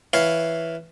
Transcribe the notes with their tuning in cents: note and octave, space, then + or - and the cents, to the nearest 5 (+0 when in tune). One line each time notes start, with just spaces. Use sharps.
E3 +0 C#5 +5 F5 +0